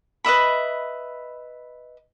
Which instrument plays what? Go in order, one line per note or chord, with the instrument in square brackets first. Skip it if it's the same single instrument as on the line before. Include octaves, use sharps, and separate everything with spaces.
[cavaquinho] B4 D#5 E5 B5